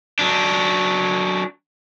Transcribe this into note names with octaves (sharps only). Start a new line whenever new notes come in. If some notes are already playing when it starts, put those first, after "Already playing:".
F#3 D4